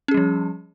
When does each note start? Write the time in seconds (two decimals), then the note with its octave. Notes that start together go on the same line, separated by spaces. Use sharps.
0.08 C#4
0.11 G#4
0.14 G3
0.17 F3